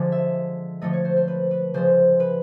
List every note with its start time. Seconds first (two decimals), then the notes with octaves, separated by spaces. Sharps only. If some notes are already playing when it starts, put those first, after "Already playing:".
Already playing: D3 F3 G#3
0.12 E5
0.81 D3 F3 A3 D#5
0.93 C#5
1.05 C5
1.16 C5
1.28 B4
1.51 B4
1.74 C#3 F3 G#3 C5
2.20 B4